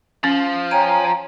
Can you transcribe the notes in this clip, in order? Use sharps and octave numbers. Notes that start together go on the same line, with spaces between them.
F3 C#4
C#5 G5 G#5 A#5